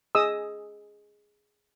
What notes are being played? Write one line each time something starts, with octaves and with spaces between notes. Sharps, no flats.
G#4 D#5 D#6 E6